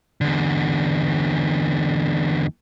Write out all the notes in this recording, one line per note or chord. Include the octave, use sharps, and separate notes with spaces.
E2 D3